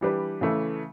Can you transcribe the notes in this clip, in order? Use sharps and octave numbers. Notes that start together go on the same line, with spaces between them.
E3 G3 D4 G4 B4
C#3 E3 A3